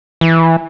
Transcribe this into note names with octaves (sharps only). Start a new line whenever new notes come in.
E3